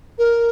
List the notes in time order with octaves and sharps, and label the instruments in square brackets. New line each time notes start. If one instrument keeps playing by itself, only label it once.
[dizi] A#4